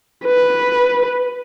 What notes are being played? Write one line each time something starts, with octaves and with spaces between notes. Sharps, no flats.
B4